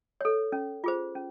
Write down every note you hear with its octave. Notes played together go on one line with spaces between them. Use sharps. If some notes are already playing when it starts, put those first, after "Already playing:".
A4 C#5
C#4
F4 G#4 C5
C#4